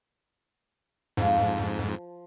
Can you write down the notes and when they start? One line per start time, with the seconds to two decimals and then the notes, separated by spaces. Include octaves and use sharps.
1.17 F2 G#2 F3